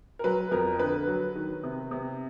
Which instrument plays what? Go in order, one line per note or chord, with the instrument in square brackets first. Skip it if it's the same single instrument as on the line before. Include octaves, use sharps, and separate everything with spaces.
[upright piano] A#4
F#3 B4
F2 A#4
D3 B4
F#3
D#3
C3
C3